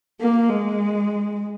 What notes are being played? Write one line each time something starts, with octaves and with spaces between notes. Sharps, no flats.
A#3
G#3